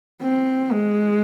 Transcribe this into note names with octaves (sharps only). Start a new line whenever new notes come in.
C4
G#3